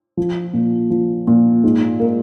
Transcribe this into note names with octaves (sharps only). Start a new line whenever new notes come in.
F3
A#2
F3
A#2
G#2
A#3